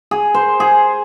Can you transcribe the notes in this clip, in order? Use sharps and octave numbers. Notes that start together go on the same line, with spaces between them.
G#4
C5
G#4